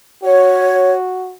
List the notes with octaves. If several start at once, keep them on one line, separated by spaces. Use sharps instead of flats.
F#4 C#5